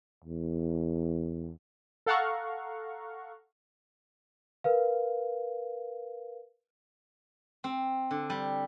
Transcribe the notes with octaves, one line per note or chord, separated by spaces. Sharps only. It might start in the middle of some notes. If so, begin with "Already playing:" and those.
E2
A4 F5 F#5 A#5 C#6
A#4 B4 F5
C4
D3
G3